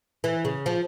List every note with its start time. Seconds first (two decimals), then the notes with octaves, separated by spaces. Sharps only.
0.24 E3
0.45 C#3
0.66 F3